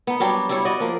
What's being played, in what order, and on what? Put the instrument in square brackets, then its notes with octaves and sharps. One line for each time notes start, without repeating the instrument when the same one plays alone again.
[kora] B3 D#4
F#3 G3 D4 G4
G3 E4 C#5
F#4 D5 D#5
F3 A#3